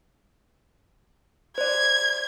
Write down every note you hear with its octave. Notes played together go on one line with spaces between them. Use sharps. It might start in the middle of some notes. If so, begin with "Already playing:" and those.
C5 D5 G#6